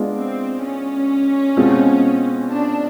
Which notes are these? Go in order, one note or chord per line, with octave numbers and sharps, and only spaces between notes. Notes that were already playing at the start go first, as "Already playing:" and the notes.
Already playing: G#3 B3 D4 F4
C4
C#4
B2 G#3 C4 F4
D4